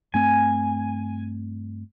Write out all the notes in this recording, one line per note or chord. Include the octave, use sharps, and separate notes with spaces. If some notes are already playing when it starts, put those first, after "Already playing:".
G2 A3 C4 G#5